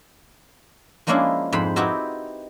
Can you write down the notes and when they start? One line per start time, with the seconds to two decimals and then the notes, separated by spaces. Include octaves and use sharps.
1.07 F3 G#3 A#3 C#4 D4 E4
1.52 F2 G#2 C5 B5
1.76 C4 D#4 E4 F#4 G4 B4